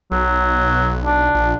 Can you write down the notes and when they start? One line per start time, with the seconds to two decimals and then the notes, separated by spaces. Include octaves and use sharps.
0.11 B1 F#3
1.05 D4
1.35 A#1